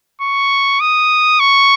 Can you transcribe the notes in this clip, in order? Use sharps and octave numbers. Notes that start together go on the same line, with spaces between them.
C#6
D#6
C#6